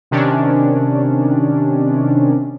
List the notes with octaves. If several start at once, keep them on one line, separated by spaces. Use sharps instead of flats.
C3 D#3 C#4 D4